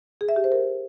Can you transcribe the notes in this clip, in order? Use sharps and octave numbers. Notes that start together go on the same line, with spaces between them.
G#4
E5
G4
C5
A#4